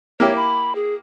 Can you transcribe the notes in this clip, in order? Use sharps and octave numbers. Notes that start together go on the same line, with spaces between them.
A#3 E4 G4 C#5
B5
G#4